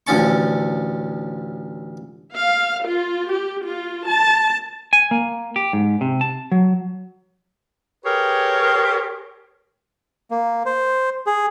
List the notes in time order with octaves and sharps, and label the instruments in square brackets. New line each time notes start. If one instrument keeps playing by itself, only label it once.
[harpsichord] A1 D2 F3 C#4 A5 C#6
[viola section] F5
F4
G4
F4
A5
[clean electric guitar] G#5
A#3
G4
G#2
C3
A5
F#3
[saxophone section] G4 G#4 A#4 B4 C#5
[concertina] A#3
C5
G#4